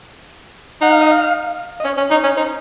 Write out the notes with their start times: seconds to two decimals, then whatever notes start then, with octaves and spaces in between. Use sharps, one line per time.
0.82 D#4 F#5
0.92 F5
1.01 D#5
1.11 F5
1.80 D#5
1.85 C#4 C#5
1.98 C#4
2.11 D#4 C#5
2.24 C#4
2.37 D#4 C5